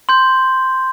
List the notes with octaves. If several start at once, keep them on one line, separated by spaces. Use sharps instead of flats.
C6 G6